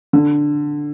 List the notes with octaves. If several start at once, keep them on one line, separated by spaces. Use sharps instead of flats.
D3